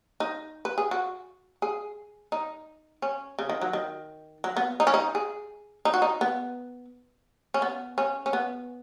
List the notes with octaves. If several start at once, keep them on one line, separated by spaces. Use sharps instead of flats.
D#4
B4
G#4
F#4
G#4
D#4
C#4
C#3
D#3
F#3
D#3
F#3
B3
D#4
C#4
D#4
G#4
D#4
F#4
D#4
B3
C#4
B3
C#4
C#4
B3